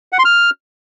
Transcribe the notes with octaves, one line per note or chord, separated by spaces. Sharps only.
F#5
C6
F6